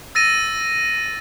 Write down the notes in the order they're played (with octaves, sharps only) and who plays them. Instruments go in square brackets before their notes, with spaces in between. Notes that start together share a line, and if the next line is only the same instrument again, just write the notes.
[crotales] E6 A6 A#6 D#7